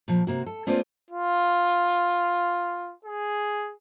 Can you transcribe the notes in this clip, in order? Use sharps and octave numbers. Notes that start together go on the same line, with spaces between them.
A#2 F3
C3 A#3 F#4
A4
A3 B3 C#4 F4 C5 D5
F4
G#4